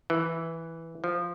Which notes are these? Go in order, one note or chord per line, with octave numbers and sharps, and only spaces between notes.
E3
F3